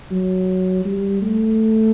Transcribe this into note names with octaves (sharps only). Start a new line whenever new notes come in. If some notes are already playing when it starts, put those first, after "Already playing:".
F#3
G3
A3